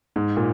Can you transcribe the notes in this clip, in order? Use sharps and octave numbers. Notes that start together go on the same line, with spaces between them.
G#2
A#2